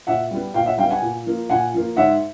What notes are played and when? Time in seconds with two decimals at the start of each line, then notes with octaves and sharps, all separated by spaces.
0.07 A#2 E5 F#5
0.31 G3 B3
0.54 A#2 F5 G5
0.66 E5 F#5
0.78 G3 F5 G5
0.83 B3
0.90 F#5 G#5
1.02 A#2
1.26 F3 A#3
1.50 A#2 F#5 G#5
1.74 F3 A#3
1.97 G#2 E5 F#5